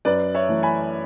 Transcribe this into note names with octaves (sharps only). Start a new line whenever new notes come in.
F#2 B4 D5
C#5 E5
E3 A3
G#5 B5